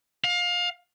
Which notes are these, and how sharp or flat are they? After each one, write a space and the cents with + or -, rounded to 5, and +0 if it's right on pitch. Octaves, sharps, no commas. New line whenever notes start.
F5 +25